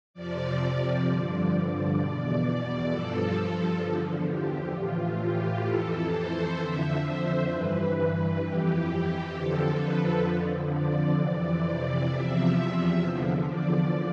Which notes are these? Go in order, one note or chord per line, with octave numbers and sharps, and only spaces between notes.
F2 C3 F3 D5
G2 D3 F3 D5
E2 B2 D5
G2 F3 A4
E2 D3 F3
G4
A2 E3 F4
G4
F2 E3 A4
C5
F2 D3 F3 E5
C5
G2 E3 B4
F2 E3 G4
F2 D3 F3 A4
B4
F2 D3 F3
D5
F2 C3 E3 D5
E2 C3 F3 E5
E2 D3 F3
D5